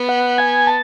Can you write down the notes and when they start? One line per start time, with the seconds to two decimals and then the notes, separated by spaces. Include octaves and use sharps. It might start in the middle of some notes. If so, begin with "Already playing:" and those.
Already playing: B3
0.09 F#5
0.38 G#5
0.67 A5